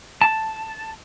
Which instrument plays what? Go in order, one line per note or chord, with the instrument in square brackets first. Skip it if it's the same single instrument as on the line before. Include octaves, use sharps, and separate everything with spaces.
[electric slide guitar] A5